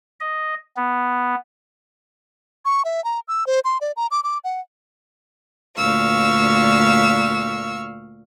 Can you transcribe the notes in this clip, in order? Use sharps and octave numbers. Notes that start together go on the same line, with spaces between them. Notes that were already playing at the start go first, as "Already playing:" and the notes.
D#5
B3
C#6
E5
A#5
E6
C5
C6
D5
A#5
D6
D6
F#5
D2 A#2 F5 C#6 E6